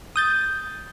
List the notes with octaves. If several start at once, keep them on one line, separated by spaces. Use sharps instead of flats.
D#6 G6 A6